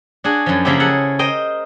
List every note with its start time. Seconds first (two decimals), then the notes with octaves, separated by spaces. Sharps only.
0.24 D4 F#4 G#4
0.46 F#2 F3
0.65 C#3 F3 F#3 A#3 E4 G4
0.80 G#4 A4 F#5
1.19 A#4 C5 D#5 G5